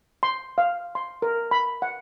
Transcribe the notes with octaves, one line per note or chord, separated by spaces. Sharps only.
C6
F5
C6
A#4
B5
F#5